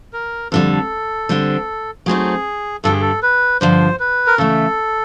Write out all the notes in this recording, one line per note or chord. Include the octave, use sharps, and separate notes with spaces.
A#4
F2 D3 G3 A4
D3 G3 C4
F#3 A3 C4 D#4 G#4
G2 D3 G3 A4
G#4
A4
B4
G2 D3 F3 C5
B4
A#4
C#3 E3 A3 A4